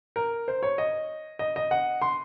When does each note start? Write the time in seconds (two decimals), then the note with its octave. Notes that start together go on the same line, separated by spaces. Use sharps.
0.16 A#4
0.48 C5
0.63 C#5
0.78 D#5
1.39 D#5
1.56 D#5
1.71 F#5
2.02 C6